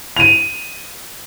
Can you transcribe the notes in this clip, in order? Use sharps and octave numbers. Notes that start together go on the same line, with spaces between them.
D#7 F7